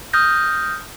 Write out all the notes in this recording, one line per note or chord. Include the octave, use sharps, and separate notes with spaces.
D#6 F6 G6 A#6